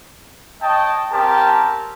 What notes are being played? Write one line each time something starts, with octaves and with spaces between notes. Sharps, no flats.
C#5 D#5 G5 A5
C4 C#4 G4 A#4 A5